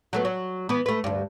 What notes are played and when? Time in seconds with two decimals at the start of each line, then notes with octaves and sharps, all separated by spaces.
0.13 F#3 A3 B3
0.25 F#3
0.69 E3 B3
0.86 A3 B4
1.04 D2 G2